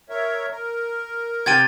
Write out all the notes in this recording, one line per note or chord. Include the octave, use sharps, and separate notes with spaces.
A#4 C#5 E5
A#4
C3 G5 G#6 A6 D#7